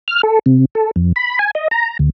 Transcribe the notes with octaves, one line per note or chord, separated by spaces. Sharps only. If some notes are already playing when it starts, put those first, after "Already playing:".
F6
A4
C3
A4
F2
B5
G#5
D#5
A#5
D2